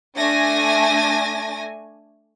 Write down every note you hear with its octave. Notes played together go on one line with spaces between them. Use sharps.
A3 D4 G#5 A#6